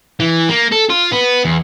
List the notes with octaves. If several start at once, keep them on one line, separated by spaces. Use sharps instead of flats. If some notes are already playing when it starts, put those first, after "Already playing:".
E3
A#3
A4
F4
B3
E2